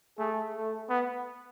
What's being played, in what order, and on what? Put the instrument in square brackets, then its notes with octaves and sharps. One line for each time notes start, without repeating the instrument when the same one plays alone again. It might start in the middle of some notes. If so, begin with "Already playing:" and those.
[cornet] A3 [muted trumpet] G#4
[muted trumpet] A3
[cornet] B3